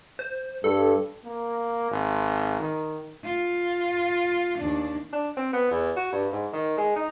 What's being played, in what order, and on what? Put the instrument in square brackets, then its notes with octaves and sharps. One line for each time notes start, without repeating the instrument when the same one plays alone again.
[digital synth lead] C5
[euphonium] G2 [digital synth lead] A4
[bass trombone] A#3
G#1
D#3
[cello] F4
D#2 D4
[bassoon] D4
C4
B3
E2
F#4
G2
G#2
D#3
G#3
D#4